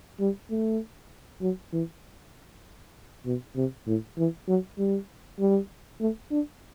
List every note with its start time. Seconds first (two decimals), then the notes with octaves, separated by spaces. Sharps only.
0.20 G3
0.50 A3
1.42 F#3
1.72 E3
3.26 B2
3.56 C3
3.87 A2
4.18 E3
4.48 F#3
4.78 G3
5.39 G3
6.00 A3
6.31 D4